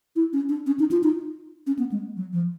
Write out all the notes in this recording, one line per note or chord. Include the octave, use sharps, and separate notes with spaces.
E4
C#4
D4
C#4
D#4
F4
D#4
C#4
B3
G#3
F#3
F3